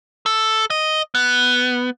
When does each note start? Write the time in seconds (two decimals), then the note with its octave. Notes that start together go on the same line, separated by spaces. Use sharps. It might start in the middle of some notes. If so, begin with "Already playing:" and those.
0.26 A4
0.70 D#5
1.15 B3